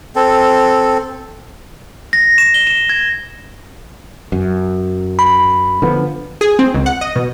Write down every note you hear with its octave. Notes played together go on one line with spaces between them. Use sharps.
C4 A4
A#6
E7
G7
E7
G#6
F#2
B5
D3 F3 B3
G#4
C4
C#2
F#5
D#5
B2